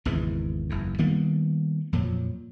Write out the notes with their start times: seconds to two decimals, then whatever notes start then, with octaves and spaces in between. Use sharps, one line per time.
0.05 G#1 E2 C#3 E3
0.70 F#1 E2
0.98 D#3 G3 A#3 B3
1.92 F2 A#2 F3 F#3